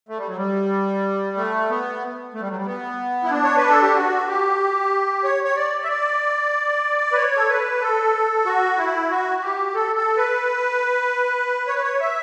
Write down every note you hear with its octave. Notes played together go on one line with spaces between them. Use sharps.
A3
G3
F#3
G3
A3
B3
A3
G3
F#3
G3
B3
E4
D4
C#5
B4
A4
G4
F#4
G4
C#5
C#5
D5
E5
D5
B4
C#5
A4
B4
A4
F#4
E4
F#4
G4
A4
A4
B4
C#5
B4
C#5
E5